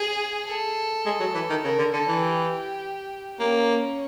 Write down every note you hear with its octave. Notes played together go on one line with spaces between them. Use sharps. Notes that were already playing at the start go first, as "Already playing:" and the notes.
Already playing: G#4
A4
G#3
F#3
E3
D#3
C#3 A#4
D3
D3 A4
E3
G4
A#3 C#4